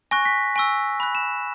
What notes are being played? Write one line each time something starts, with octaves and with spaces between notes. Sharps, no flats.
G#5 C#6 F#6 A#6
B6
G#5 C#6 E6
B5 F#6
E7